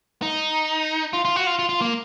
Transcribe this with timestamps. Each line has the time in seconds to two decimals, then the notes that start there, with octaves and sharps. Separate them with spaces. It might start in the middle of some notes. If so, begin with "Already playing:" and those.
0.22 D#4
1.13 F4
1.25 F4
1.36 F#4
1.47 F4
1.59 F4
1.69 F4
1.81 A#3